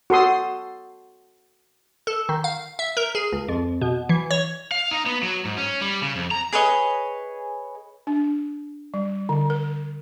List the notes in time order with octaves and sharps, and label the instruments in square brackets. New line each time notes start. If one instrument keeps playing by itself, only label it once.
[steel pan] F#4 A4 C6 D#6
[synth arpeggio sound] A4
D#3
F5
E5
A#4
G#4
C#2
F2
B2
E3
C#5
[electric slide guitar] F5
D#4
B3
F#3
G#2
C#4
G3
C#3
F2
A#5
[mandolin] G#4 B4 C#5 D#5
[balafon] D4
G3
D3
A#4